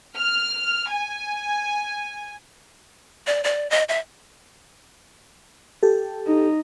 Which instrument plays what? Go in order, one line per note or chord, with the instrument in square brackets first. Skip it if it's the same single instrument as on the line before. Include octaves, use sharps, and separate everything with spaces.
[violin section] F6
G#5
[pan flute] D5
D5
D#5
E5
[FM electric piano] G4 A4
[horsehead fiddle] D#4